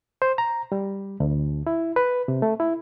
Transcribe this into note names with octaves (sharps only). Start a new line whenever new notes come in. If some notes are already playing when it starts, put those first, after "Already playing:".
C5
A#5
G3
D2
E4
B4
C3
A3
E4